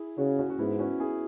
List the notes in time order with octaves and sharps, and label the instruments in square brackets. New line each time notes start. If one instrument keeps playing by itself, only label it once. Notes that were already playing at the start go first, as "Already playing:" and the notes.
Already playing: [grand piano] E4 G#4
[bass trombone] C#3 [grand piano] C#4 F#4
[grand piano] C#4 F#4
F#4
[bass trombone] G#2 [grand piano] B3 E4
[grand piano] C#4 F#4
E4 G#4